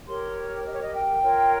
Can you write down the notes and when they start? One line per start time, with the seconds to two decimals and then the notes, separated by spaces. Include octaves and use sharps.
0.07 G4 A#4 C#5 C6
0.65 D#5
0.73 C#5
0.82 D#5
0.93 G5
1.22 F4 A#4 C#5